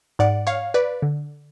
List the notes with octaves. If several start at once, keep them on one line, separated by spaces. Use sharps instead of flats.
G#2 D5 F#5
C#5 F5
B4 D5
D3